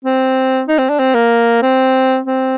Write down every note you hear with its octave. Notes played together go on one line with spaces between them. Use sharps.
C4
D#4
C4
D4
C4
A#3
C4
C4